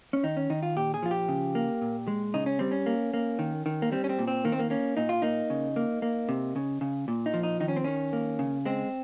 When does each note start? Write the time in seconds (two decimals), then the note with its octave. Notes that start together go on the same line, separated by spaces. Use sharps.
0.13 C#4
0.23 D#3 D#4
0.37 C#4
0.50 D#3 D#4
0.63 F4
0.76 A#2 G4
0.94 G#4
1.03 F3 F4
1.11 G4
1.29 C#3
1.55 A#3
1.82 A#2
2.07 G#3
2.34 C#3 D#4
2.46 C#4
2.59 G3 C4
2.71 C#4
2.86 A#3
3.14 A#3
3.39 D#3
3.66 D#3
3.82 A#3
3.92 G3 C4
4.04 C#4
4.09 C4
4.19 A#2
4.28 C4
4.45 D#3 A#3
4.52 C4
4.59 A#3
4.70 A#3 C#4
4.97 A#2 D#4
5.09 F4
5.22 A#3 D#4
5.50 C#3
5.76 A#3
6.02 A#3
6.29 C3
6.56 C#3
6.81 C#3
7.08 A#2
7.26 D#4
7.34 F3
7.43 D#4
7.60 D#3 D#4
7.68 C#4
7.76 C4
7.84 D#3 C#4
8.13 A#3
8.39 C#3
8.66 G#3 C4